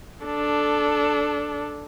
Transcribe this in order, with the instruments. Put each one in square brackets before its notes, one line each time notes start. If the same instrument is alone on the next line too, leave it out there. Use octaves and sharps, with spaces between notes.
[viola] D4 A4